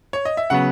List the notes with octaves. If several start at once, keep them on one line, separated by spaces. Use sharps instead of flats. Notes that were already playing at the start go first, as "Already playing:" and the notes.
C#5
D#5
E5
C#3 F#3 B3 F#5